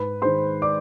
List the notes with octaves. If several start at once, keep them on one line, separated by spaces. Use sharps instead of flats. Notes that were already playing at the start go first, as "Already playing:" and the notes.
Already playing: G#2 B4 B5
D#3 G#3 C5 C6
D5 D6